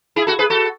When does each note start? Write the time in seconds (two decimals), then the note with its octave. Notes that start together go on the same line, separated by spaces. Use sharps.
0.16 E4 G#4
0.27 F#4 A4
0.39 G#4 B4
0.50 F#4 A4